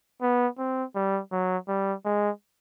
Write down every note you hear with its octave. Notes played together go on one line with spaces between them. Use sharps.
B3
C4
G3
F#3
G3
G#3